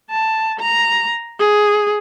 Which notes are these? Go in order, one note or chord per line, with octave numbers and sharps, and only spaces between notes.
A5
A#5
G#4